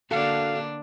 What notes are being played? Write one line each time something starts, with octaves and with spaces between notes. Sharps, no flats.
D3 A#3 D4 F#4 A4 F5